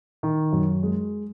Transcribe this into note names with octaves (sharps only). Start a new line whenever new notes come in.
D#3
F#2
G#3